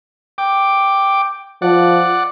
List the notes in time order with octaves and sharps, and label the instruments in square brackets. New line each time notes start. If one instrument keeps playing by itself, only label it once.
[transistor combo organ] G5 D6
[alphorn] F3 [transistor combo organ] D5 F#5